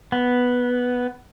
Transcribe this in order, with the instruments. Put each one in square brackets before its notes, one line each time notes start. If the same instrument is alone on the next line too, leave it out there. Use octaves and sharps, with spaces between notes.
[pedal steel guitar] B3